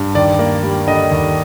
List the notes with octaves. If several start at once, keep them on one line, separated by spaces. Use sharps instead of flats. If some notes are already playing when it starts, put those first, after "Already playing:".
Already playing: G2
D#2 D5
A#3
G3
D3 D#5
D#2